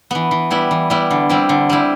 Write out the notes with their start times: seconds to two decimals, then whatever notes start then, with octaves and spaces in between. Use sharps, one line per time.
0.11 E3 B3
0.31 E3
0.51 G3 B3 E4
0.71 E3
0.90 G3 B3 E4
1.11 D3
1.29 G3 C4 E4
1.49 D3
1.69 G3 C4 E4